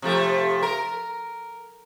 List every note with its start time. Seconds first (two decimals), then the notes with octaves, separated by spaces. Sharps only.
0.02 C3 F3 A3
0.62 A#4